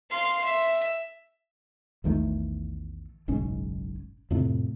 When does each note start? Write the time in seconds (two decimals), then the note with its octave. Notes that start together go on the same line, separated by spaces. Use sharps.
0.10 F5 C6
0.43 E5
2.04 A#1 E2 D#3 A3
3.28 F#1 B1 G#2 C#4
4.31 F2 A2 C3